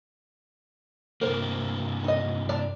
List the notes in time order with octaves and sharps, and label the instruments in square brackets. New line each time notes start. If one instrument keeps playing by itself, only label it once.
[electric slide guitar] G2 C3 A#3 [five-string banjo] A#4 C5
[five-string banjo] D#4 D#5
D5 A5 A#5